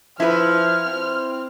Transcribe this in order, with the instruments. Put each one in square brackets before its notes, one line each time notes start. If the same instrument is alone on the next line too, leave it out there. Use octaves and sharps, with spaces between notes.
[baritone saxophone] F3 [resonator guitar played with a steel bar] E4 B4 [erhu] F6
[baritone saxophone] C4